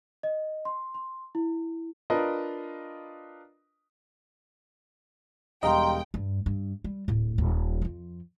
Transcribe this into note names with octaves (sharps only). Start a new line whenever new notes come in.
D#5
C6
C6
E4
D4 F4 A#4 B4 D#5
E1 G3 D#5 F5 G5 A#5 C6
G2
G2
G3
D1 A2
D#1
F2 F3